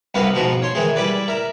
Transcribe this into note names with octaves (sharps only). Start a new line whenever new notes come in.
C2 G2 B3 F#4 B4 F5
G#2 B2 F3 F#4
C#5 C6
D#3 E3 G#3 G#4
G3 E4 B4 D5
A#4 E5